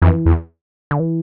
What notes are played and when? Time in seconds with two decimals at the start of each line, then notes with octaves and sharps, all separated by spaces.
0.02 F2 E3
0.26 E2
0.91 D3
1.00 E3